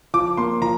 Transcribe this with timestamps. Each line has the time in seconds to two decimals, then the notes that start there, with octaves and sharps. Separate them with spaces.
0.14 F3 D6
0.37 A#3 C6
0.62 F3 A#5